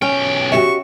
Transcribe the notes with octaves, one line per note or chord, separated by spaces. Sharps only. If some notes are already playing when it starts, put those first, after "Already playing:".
B1 C#4 G5
F#4 G4 E5 C#6